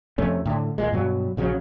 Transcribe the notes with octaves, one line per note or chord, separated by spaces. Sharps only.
F2 C3 A3 C#4
A2 D3
D#1 A#2 G#3
G2 B2 F#3
A#1 C#3 F#3 C#4